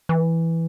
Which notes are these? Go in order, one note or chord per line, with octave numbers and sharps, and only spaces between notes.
E3